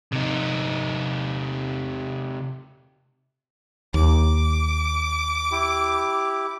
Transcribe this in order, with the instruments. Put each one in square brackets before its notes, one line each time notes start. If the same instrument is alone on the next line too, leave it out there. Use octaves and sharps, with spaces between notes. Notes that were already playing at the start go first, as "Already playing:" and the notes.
[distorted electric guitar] C3 D#4
[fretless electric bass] D#2 [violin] D6
[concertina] E4 G4